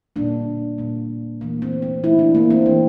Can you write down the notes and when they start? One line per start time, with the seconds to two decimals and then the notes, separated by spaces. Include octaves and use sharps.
0.16 A#2 G3 A#3 D4
0.78 A#2 G3 A#3
1.41 E3 A3 A#3
1.62 C4
1.82 C4
2.03 E3 A3 E4
2.19 D4
2.35 A#3
2.50 C4
2.66 E3 A#3 D4